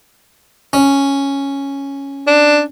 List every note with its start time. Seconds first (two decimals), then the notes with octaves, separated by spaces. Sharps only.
0.73 C#4
2.27 D4